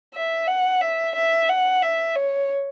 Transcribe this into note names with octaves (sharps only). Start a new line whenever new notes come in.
E5
F#5
E5
E5
F#5
E5
C#5